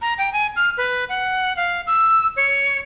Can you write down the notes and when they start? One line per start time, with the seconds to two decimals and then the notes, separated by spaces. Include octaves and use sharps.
0.02 A#5
0.18 G5
0.33 G#5
0.56 F6
0.77 B4
1.09 F#5
1.57 F5
1.87 E6
2.36 C#5